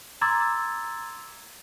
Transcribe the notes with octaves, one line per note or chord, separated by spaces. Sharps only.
A#5 C6 D6 E6 G#6 A6